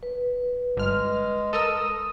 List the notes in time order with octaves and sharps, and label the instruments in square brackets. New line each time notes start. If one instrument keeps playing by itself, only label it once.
[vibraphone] B4
[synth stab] G1 F6 [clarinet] G#3
[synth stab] A4 A#4 E6 [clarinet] D#6